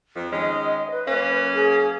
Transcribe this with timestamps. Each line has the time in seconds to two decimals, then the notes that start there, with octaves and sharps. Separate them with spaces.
0.16 F2
0.32 D#3 G#3 C#4 D#5
0.91 B4
1.07 F#2 A#3 C#4
1.54 G#4